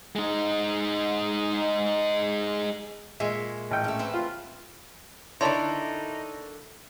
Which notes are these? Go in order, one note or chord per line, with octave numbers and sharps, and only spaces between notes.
G#3 D#4
A#2 G#3 C#5 E5 G#5
A1 G5
A3 C#4
C4 B4
F4
D3 D#4 E4 A#4 C#5 D5 A5 C6